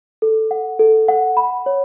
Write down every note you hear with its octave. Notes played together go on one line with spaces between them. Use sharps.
A4
F#5
A4
F#5
B5
C#5